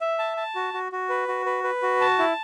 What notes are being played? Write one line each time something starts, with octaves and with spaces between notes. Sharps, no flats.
E5
A5
A5
F#4
F#4
F#4
B4
F#4
B4
B4
F#4
A5
E4